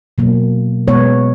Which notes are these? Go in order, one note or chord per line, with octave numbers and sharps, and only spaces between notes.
B2 F#3 A#3
B2 G#3 B3 C#5